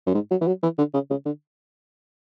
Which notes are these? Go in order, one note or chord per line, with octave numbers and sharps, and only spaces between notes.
F#2
G#2
F#3
E3
F#3
E3
D3
C#3
C#3
D3